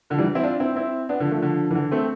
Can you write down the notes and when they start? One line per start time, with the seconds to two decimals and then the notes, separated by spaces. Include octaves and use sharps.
0.10 D3 F3
0.18 E3 G3
0.35 C4 E4
0.43 D4 F4
0.60 C4 E4
0.76 C4 E4
1.09 B3 D4
1.20 D3 F3
1.31 F3 A3
1.42 D3 F3
1.71 E3
1.75 D3
1.91 A3 C4